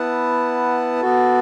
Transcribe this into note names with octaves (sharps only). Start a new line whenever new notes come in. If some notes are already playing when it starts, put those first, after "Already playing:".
Already playing: B3 E4 B4 F#5 A5
B3 F#4 A4